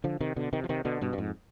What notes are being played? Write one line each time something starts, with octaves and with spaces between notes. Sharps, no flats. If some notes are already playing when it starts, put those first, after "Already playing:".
D3 F3
C3 D#3
B2 D3
C3 D#3
F3
C3 D#3
B2 D3
G2 B2
G2
F2 G#2